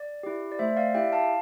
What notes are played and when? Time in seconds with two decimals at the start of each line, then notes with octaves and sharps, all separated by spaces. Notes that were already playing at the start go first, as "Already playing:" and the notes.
Already playing: D5
0.23 E4 G4
0.52 D5
0.59 A3 C5 E5
0.77 D5 F5
0.94 E4 G4 E5 G5
1.12 F5 A5